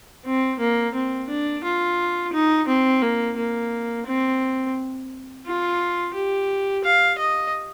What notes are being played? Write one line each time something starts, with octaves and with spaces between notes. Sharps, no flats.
C4
A#3
C4
D4
F4
D#4
C4
A#3
A#3
C4
F4
G4
F5
D#5